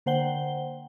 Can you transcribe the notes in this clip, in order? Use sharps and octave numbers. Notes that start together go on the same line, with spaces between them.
D3 A#3 C5 F#5 G5 G7